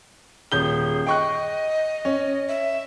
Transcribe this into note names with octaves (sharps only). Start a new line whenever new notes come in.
D#1 G#4 G6 G7
D#5 G5 C#6 F#6
C#4
E5